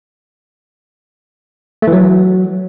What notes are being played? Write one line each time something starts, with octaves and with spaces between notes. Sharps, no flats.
A3
E3
F#3